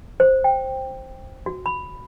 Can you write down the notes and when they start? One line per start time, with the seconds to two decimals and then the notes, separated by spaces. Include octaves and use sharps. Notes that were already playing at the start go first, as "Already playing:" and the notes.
0.20 C5
0.44 G5
1.46 F#4
1.66 B5